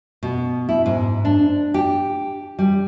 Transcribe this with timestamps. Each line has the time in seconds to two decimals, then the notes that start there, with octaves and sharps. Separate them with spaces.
0.23 B2
0.69 E4
0.86 G#2
1.25 D4
1.74 G4
2.59 G3